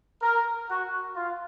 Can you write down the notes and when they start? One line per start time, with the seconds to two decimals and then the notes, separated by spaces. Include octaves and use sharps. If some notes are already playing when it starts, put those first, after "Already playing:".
0.22 A#4
0.69 F#4
1.16 F4